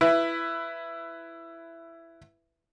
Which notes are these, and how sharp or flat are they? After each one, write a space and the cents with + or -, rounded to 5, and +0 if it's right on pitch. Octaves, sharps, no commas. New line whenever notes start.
E4 +15 B4 +5